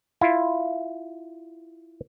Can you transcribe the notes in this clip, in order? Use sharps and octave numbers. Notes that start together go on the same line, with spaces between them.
E4 F4